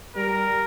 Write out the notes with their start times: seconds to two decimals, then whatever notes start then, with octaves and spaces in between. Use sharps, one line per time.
0.15 G3 A#4